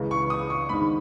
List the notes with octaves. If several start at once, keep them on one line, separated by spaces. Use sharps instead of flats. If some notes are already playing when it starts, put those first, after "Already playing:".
Already playing: C#2 C#3 E3
C#6
D#6
C#6
G#2 D#3 B5